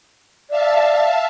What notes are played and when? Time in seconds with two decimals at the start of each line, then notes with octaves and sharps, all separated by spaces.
0.50 D5 E5 F5 A5